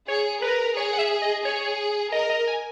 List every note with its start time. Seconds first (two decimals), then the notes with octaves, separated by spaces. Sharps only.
0.08 G#4 C#5
0.42 A#4 B4
0.76 G#4 C#5
0.93 F#5
0.99 E5
1.22 D#5
1.45 G#4 C#5
2.12 A#4 D#5
2.30 D#5
2.47 G#5